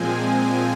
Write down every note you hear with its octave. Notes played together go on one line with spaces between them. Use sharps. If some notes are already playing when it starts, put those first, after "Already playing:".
Already playing: A#2 F3 G#3 C4 G#5